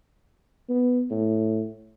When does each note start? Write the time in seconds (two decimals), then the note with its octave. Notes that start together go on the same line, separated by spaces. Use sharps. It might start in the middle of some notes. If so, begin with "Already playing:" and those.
0.69 B3
1.11 A2